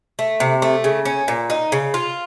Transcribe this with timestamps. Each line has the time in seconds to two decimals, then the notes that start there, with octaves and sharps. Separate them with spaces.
0.19 A3
0.40 C3
0.62 A3
0.84 C#3
1.05 C#4
1.28 A#2
1.50 D#4
1.72 C#3
1.94 F4